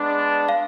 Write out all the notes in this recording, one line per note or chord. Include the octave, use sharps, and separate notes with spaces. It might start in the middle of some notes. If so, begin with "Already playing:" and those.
Already playing: G#3 B3 D4
F5